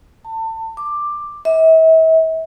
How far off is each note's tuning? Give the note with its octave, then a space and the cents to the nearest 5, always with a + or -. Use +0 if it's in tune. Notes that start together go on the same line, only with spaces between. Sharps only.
A5 +30
D6 +10
E5 -40